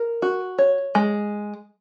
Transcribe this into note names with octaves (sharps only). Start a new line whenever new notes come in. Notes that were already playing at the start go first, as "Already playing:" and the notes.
Already playing: A#4
F#4
C#5
G#3